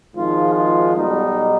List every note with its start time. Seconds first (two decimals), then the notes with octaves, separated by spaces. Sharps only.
0.15 G#1 G#2 F3 G#3 F4
0.55 F4
0.95 B1 B2 G3 D#4